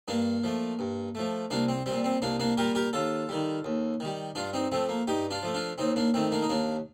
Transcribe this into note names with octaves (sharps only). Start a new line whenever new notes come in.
G2 A#3 D4
F3 A3
G2
F3 A3
C2 A#3 D4
C4
A#2 G3 C4
C4
C2 A#3 D4
A#3 D4
A#2 G3 G4 A#4
G4 A#4
D#2 F4 A4
D#3 G3
D#2
D#3 G3
G2 D4 F4
C4 D#4
F3 A3 C4
A#3
G2 D#4 G4
D4 F4
F3 A3
D4 F4
D#2 C4 D#4
A#3 D4
D#3 A3 C4
A#3 D4
D#4
D#2 A#3 D4